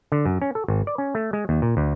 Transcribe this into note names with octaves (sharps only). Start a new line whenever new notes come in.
D3
F#2
C#4
A4
G#1
D5
C#4
A3
G#3
D#2
A#2
D2